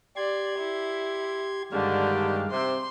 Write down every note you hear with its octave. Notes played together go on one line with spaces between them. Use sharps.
G4 D5 C6 G#6
E4
G2 D3 D#3 G#3 D4 G4 F5
C3 C4 C6